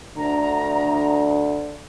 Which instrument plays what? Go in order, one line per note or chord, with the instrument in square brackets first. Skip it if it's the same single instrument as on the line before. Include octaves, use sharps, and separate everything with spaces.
[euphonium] D2 [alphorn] D3 [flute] A#5